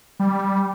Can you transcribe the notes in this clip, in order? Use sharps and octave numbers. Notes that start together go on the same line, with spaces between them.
G3